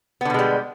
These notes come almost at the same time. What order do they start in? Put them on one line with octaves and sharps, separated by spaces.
B3 D3 B2 G#3 G3